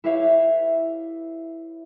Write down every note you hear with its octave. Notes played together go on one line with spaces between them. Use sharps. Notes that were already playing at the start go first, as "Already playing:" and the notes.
E4 G4 B4 C#5 E5 F5